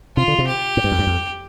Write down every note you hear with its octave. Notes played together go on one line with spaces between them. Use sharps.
C3 F4
D3
C3
G4
A2
G2
F2
G2
F2